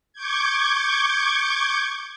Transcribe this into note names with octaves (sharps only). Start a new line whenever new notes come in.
C#6 D6 G6 G#6